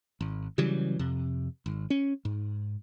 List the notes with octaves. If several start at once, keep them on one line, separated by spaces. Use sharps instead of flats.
G#1
C#3 E3 F#3 G3
F2 C3
G#1
C#4
G#2